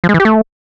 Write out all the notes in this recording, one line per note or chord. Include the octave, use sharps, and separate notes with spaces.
F3
G#3
E3
G4
A3